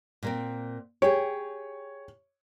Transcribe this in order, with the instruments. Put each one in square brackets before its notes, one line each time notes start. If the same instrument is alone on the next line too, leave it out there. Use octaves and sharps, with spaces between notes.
[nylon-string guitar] A#2 A#3 C4
[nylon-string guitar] G4 G#4 [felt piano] C#5